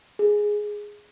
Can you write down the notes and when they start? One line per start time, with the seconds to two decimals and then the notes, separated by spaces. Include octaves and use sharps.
0.19 G#4